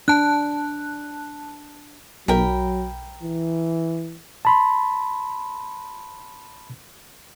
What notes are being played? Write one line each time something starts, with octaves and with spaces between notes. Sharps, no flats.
D4 A5 F#6
B1 F#3 A#4 G5 B5
E3
A5 B5 C6